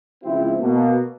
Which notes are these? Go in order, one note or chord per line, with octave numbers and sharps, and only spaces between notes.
C#2 F3 C4 E4
B2 A#3